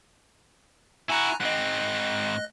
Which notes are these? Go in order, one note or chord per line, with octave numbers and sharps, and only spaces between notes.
E4 F#4 G#5 A#5 F#6
G#2 C4 D#5 F#6